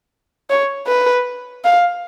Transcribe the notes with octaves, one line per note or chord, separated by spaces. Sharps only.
C#5
B4
F5